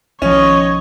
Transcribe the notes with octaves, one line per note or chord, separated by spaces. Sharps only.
B1 D#3 F3 C#4 C#5 D#5